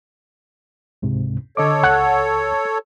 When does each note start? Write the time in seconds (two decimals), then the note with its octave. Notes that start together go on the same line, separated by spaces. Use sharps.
1.02 C#2 G#2 C3
1.57 D3 A4 C#5 D#5 D6
1.83 C#2 F#5